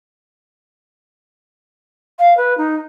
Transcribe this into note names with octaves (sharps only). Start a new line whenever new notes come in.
F5
B4
D#4